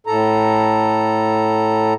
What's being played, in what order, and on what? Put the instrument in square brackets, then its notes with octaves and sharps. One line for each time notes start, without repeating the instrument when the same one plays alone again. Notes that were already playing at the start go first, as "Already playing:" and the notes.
[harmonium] A2 A4 A#5